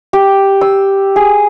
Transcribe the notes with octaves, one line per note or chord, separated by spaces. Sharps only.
G4
E6
G#4